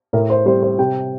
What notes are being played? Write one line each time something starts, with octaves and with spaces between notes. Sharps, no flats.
A2 A#4
C5
G3 C4 C5
C5
C3 G5